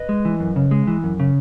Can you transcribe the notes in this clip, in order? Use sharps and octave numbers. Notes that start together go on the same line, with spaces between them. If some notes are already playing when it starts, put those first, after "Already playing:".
Already playing: B4 D#5
G#3
E3
F#2
C#3
G#3
E3
F#2
C#3